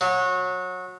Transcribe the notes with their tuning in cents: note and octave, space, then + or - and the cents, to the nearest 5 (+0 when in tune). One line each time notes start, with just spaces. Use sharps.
F#3 -25